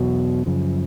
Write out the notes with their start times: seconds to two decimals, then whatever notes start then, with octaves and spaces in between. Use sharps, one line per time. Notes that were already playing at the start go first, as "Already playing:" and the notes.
Already playing: E2 B2 F#3
0.46 F#2 C#3 F3